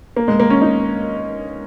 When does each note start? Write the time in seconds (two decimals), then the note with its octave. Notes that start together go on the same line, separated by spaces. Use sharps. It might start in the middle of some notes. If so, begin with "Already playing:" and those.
0.17 A#3
0.28 G#3
0.40 A#3
0.50 C#4
0.62 D#4